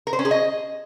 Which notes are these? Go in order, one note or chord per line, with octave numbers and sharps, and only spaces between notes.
A#4
C5
C#4
G#4
D#5